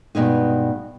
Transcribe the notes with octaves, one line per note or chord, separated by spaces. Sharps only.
G2 B2 G#3 D#4